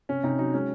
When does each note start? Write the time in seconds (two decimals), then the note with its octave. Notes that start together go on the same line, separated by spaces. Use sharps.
0.09 C3 C#4
0.23 C3 D#4
0.39 F#3 D#4
0.54 G#3 C#4